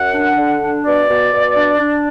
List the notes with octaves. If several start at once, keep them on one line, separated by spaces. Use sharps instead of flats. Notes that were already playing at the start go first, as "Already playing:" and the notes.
Already playing: F#2 F#5
D4
D3
D4
B2 D5
B2
B2
D4
D4